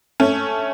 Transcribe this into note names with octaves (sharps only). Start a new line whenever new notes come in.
A3 C#4